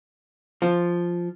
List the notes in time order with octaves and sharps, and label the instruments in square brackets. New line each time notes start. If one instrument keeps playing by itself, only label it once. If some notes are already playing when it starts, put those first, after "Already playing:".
[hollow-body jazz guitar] F3